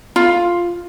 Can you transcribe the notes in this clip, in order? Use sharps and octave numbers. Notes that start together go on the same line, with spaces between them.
F4